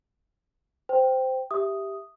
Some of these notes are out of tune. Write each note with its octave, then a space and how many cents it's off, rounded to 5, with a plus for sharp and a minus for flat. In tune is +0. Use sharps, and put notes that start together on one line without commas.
C5 -10 G5 +0
G4 +0 E5 +0 D#6 +0